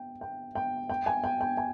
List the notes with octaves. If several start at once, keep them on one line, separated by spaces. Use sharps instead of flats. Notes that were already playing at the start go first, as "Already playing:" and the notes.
Already playing: G5
G5
G5
G5
G#5
G5
G5
G#5